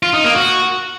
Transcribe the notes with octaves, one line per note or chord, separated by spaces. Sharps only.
F4
D#4
A#3
F#4